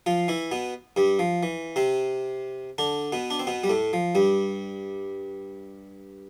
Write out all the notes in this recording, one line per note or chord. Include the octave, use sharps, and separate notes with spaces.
F3 F4
E3 E4
B2 B3
G2 G3
F3
E3
C3 C4
D3 D4
B2 B3
D4
C4
B2 B3
G3
A2 A3
F3
G2 G3